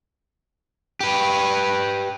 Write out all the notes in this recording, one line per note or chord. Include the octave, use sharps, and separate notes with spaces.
G4 B4